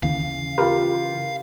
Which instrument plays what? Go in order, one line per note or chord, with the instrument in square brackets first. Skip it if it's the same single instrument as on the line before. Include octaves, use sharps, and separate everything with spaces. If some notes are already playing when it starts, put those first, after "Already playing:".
[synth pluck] D#2 [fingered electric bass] C#3 E3 [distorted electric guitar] F5
[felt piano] F4 G4 [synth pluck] A#4 B4